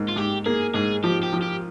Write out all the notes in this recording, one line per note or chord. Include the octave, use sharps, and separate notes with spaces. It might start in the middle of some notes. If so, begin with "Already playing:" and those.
Already playing: G#2 A#3
F4
G#2 G4
A#3 G#4
G#2 G#4
F3 G4
G4
F3
G4